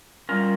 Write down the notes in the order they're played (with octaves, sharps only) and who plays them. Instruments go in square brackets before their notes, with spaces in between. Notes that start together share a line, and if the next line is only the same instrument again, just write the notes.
[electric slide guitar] G3 C#4 F4 A#4